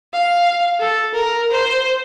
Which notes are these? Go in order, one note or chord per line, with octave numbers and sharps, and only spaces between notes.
F5
A4
A#4
C5